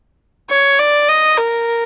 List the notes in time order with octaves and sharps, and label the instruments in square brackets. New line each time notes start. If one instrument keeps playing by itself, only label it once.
[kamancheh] C#5
D5
D#5
A#4